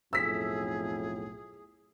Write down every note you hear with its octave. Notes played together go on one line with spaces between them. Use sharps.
B1 F2 A2 G#4 E6 B6